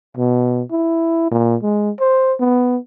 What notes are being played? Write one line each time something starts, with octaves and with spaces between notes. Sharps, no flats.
B2
E4
A#2
G#3
C5
B3